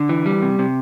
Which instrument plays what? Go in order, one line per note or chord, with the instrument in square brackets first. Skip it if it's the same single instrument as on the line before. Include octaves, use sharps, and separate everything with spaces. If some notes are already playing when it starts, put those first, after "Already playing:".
Already playing: [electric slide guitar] D3
E3
G3
C3
C3